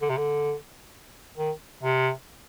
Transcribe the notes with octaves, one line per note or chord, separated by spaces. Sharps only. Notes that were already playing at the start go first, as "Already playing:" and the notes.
D3
C3
D3
D#3
C3